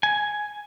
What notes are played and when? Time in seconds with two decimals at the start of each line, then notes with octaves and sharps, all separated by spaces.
0.03 G#5